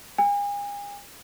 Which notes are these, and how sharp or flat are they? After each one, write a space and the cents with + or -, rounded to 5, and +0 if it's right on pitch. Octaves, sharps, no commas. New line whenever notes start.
G#5 -40